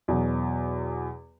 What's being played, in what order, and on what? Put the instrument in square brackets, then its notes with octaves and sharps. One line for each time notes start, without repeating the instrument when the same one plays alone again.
[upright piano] E2 B2 F#3